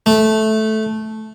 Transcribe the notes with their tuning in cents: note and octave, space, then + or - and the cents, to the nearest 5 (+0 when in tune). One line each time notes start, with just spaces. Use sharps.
A3 -10